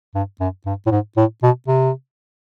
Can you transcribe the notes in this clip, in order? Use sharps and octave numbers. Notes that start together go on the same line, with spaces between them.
G2
F#2
G2
A2
G#2
A2
B2
C3